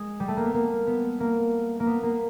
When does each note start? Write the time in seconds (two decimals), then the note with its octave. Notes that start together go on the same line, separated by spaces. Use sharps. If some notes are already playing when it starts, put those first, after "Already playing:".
Already playing: G#3
0.20 G3
0.28 A3
0.37 A#3
0.45 B3
0.54 A#3
0.87 B3
1.20 A#3
1.80 A#3
1.87 B3
2.03 A#3